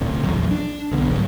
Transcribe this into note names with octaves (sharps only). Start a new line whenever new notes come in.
D1 D2 A2 C3
A#1 E2 A#2 F#3
D4
B1 D3 B3
G1 D2 G#2 F#3